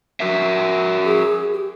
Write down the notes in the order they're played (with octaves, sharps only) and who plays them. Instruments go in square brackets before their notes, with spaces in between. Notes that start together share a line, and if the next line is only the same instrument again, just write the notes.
[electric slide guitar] F#4 A#4 E5
[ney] G#4
G4